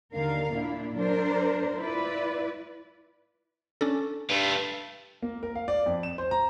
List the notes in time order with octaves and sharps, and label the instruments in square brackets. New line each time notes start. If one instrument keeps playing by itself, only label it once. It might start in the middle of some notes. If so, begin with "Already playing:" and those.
[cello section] D#2 D3 A#4 F5
A#2 D4 E4
F#3 D4 A#4 C5
E4 F4 B4 D5
[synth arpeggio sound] C#4 D4 A4
[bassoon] G2 [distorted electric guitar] A3 F4
[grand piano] A#3
A#4
F5
D5
F2
E7
C5
A#5